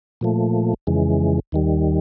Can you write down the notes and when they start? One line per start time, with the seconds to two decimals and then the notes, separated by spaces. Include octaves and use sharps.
0.21 A#2 F3 A3
0.87 F2 C#3 E3 G#3
1.52 D#2 D#3 G3